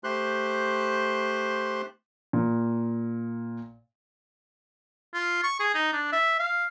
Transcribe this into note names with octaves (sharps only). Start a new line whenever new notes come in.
A3 G4 C5 C6 F#6
A#2
F4
C#6
G#4
D#4
D4
E5
F5